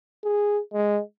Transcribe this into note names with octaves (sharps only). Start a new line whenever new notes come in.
G#4
G#3